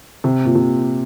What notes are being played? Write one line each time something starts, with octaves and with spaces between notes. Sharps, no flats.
C3
A#2
C3